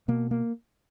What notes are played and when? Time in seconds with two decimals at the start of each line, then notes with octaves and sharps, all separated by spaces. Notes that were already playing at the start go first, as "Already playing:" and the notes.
0.08 B2 A#3
0.31 A#3